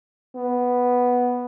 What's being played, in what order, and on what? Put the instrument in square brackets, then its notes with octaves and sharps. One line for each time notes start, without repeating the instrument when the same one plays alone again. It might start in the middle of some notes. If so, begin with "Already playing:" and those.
[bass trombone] B3